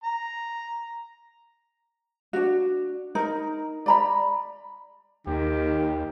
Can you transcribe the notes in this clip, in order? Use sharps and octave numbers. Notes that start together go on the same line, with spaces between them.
A#5
D4 F#4
D#4 A#4
D5 A#5 B5
D#2 D#3 G4